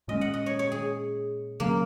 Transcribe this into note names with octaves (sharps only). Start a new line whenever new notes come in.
A#2 G#3 C#4 D#5
F#5
D#5
C#5
C#5
G#4
C#3 F#3 A#3 C#4